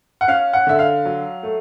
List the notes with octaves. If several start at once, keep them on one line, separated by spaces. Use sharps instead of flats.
F#5
C#4 F5
F#5
D3 E5
F5
F#3
A3